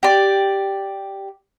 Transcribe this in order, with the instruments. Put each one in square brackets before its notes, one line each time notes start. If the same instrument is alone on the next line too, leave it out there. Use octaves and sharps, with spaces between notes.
[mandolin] G4 D5